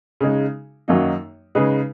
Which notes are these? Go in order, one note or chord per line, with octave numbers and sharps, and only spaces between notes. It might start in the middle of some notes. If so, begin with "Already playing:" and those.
C#3 G#3 D#4
F#2 D#3 F#3 A#3 D#4
C#3 G#3 D#4 G#4 B4